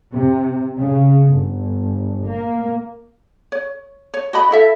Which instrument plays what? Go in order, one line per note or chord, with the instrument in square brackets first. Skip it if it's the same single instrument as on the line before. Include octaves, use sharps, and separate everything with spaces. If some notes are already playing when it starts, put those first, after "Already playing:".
[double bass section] C3
C#3
G1
A#3
[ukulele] C#5
C#5
F#4 D#5 B5
E4 A4 E5